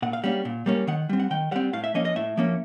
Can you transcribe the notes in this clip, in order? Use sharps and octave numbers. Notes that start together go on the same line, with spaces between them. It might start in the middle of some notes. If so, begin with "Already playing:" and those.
A#2 F#5
F5
G3 A#3 C#4 F#5
A#2
G3 A#3 C#4
D#3 F#5
G3 C4
F#5
D#3 G5
G3 C4 F#5
A2 F5
E5
F3 A#3 C#4 D#5
D#5
A2 E5
F3 A#3 C#4